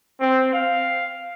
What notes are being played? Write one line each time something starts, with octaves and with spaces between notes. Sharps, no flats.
C4
F5